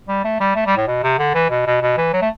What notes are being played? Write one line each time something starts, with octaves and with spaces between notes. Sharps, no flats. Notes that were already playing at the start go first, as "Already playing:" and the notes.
G3
A3
G3
A3
G3
A2
B2
C3
D3
E3
B2
B2
B2
E3
F#3
A3